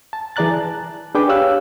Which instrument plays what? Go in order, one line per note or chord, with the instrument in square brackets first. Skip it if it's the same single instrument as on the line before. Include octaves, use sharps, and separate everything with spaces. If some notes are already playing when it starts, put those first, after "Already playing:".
[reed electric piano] A5
E3 G#4 D5 A#5 F#6 A6
A5
D4 G#4 B4 G5 D6
G4 C#5 F5 E6 F#6